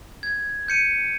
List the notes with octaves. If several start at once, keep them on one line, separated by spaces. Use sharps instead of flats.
G#6
G6 C#7 D#7